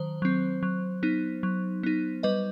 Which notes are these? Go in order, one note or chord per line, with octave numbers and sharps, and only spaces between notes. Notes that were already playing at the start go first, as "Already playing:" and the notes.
Already playing: D#3 F#3 C5
F#3 C4
F#3
B3 D#4
F#3
B3 D#4
G3 B4 D#5